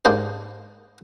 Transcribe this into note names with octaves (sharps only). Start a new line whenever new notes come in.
G#2 A#3 D4 G4 C5